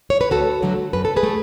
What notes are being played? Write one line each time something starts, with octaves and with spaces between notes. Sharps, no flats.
C#5
B4
D2 F#4 A4
D3 F#3 A3
F#2 B4
A4
G#4 B4
A3